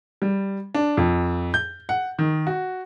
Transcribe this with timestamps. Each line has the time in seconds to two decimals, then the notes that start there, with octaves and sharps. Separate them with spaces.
0.22 G3
0.75 D4
0.97 F2
1.54 G6
1.89 F#5
2.19 D#3
2.47 F#4